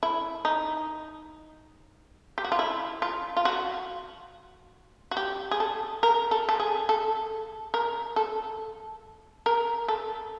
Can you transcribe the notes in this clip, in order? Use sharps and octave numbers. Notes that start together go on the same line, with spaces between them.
E4
D#4
G4
F#4
F4
E4
F4
F4
F#4
F#4
G4
G#4
A4
A#4
A4
A4
G#4
A4
A#4
A4
A#4
A4